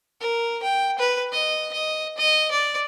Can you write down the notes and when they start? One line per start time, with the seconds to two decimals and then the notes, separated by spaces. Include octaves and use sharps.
0.20 A#4
0.63 G5
0.99 B4
1.32 D#5
1.73 D#5
2.17 D#5
2.51 D5